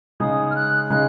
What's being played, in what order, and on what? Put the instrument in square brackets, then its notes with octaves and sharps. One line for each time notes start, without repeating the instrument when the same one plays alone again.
[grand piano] C#3 G#3 D#4 G#4 [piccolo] D#6
[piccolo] F6
F#6
[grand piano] C#3 G#3 D#4 G#4 [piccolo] F#6